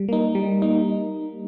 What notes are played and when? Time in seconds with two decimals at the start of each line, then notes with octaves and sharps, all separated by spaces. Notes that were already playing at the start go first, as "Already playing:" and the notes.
Already playing: G3
0.09 A#3 D#4
0.35 G3
0.62 A#3 D#4